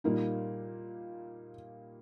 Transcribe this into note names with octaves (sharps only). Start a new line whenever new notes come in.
A#2 G3 A#3 D#4